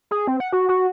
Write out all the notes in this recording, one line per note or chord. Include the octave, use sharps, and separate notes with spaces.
G#4
C4
F#5
F#4
F#4